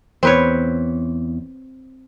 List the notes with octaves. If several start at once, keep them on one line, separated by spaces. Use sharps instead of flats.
E2 C4 B4 C#5